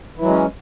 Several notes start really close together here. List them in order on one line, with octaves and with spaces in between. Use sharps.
E3 F#3 G#3 C#4